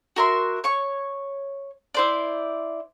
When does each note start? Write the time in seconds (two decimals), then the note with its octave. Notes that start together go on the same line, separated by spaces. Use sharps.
0.16 F#4 A#4 E5 C6
0.64 C#5 C#6
1.94 E4 C5 D5